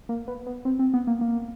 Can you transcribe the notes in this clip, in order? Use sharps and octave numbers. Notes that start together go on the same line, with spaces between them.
A#3
B3
B3
C4
C4
B3
A#3
A#3